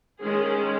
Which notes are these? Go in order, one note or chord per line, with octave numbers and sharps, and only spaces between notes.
D#3 G#3 C#4 G#4